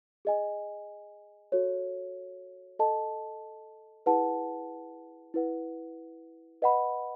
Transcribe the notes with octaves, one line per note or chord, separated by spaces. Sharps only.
G#4 D#5 G#5
F#4 A4 C#5
A4 D#5 A5
E4 G#4 B4 F#5 A5
E4 B4 F#5
B4 D#5 F#5 B5